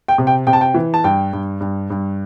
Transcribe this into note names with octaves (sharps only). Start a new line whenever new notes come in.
G5
C3
G5
C3 G5
A5
G5
E3
A5
G2 G5
G2
G2
G2